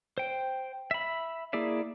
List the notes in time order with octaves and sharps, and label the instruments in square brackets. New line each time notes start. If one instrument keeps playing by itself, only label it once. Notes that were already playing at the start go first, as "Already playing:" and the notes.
[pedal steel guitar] C5 G5
E5 B5
A#3 E4 G#4 D5 E5